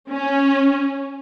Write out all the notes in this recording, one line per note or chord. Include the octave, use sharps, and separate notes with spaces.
C#4